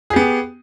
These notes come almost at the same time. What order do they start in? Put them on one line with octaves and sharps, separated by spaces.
G#4 G4 B3